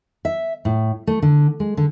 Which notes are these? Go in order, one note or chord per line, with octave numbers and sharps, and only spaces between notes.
E5
A2
A3
D3
G#3
D3